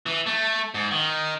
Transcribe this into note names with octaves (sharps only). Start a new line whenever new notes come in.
E3
A3
G#2
D#3